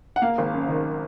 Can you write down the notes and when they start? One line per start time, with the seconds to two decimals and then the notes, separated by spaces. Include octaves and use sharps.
0.16 F#5
0.22 A#3 F5
0.38 G#1
0.53 F#2
0.68 D#3